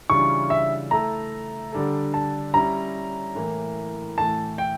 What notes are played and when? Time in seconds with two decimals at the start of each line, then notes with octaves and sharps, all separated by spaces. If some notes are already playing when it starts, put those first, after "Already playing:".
0.10 C#3 E3 G3 D4 F4 C#6
0.50 E5
0.91 A3 E4 A4 A#5
1.72 D3 G3 D4 A4
2.14 A5
2.54 G3 C#4 E4 A#5
3.35 A2 E3 A#3
4.17 A2 E3 A3 A5
4.58 G5